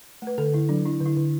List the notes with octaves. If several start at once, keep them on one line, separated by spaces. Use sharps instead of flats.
A3 B4
D3 A4
D3 E4
F#3 D4
D4 E4
D3 E4
D3